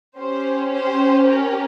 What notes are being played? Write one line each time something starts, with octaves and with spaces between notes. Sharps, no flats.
C#4 G4 C5
C5
A#4